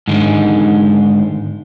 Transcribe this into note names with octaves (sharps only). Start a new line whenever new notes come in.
G#2 D3 D#3 G#3